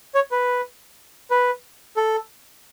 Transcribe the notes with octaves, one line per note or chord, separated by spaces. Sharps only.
C#5
B4
B4
A4